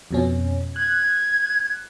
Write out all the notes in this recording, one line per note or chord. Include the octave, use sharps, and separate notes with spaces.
F2 B2 C#4
F#6 G#6